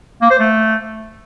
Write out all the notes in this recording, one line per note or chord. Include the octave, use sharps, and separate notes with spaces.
A#3
C5
A3